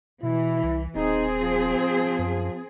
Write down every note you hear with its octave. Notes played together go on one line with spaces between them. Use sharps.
B2 E3 E4
C2
D#1 C4 D#4 G#4
F3
F#2